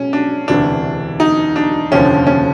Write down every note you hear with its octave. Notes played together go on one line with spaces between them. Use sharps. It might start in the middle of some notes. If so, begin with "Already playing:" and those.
Already playing: B2 G#3 C#4
D4
E1 D2 C3 E3 D4
D#4
D4
F1 D#2 D3 F3 C#4
C#4